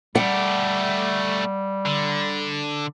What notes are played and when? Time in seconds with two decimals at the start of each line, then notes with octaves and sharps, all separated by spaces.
0.15 G3 A3 G4 F#5
1.86 D3